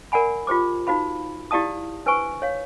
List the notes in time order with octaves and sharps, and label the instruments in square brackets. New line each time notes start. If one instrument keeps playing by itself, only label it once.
[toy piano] A#4 D5 F#5 G#5 B5
F4 G4 C5 D6
D#4 F#4 C5 F5 B5
E4 G4 D5 F5 A5 D#6
D4 B4 C5 G#5 C#6
C#5 F5